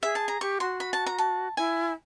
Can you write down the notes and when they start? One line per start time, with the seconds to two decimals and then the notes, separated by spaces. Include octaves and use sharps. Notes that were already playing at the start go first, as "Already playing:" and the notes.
0.03 G#4 E5
0.15 A5
0.28 A#5
0.41 G4 C#6
0.60 F#4 C6
0.80 B5
0.93 A5
1.06 A#5
1.18 A5
1.57 E4 G#5